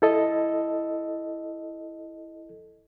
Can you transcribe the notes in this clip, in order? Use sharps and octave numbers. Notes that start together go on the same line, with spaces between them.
E4 A4 D#5